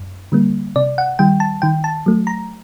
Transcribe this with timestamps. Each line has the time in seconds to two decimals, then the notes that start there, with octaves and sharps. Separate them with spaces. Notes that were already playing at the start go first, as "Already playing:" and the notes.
Already playing: F#2
0.32 D3 G3 A#3
0.76 C3 D5
0.98 F#5
1.19 D#3 G3 G5
1.40 A5
1.62 D#3 G5
1.84 A5
2.06 F#3 A3
2.27 A#5